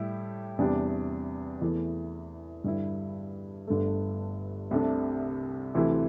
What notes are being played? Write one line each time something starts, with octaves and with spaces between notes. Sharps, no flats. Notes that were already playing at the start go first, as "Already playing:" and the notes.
Already playing: A2 G3 E4 G4
E2 C3 G3 D4 G4
E2 E3 A3 E4
G2 D3 G3 E4
G1 G2 D3 A3
C2 C3 A3 D4
D2 C3 E3 A3 E4